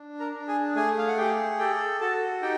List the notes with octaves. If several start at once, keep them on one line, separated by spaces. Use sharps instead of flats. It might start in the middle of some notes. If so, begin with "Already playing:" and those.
Already playing: D4
A#4 A#5
D4
G#4 G#5
A3 G#4 G#5
F5
F#5
G4 G#4 G5
G4 A4 G5
F#4 A4 A5
D#4 G4 G5